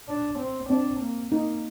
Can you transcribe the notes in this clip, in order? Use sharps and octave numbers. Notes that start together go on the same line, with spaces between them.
D4
C4
C4 D4
A#3
A#3 D#4